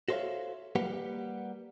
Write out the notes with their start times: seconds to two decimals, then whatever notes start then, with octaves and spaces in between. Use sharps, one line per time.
0.08 F#4 A4 C5 C#5 E5 F5
0.76 G3 A#3 G4 B4 F#5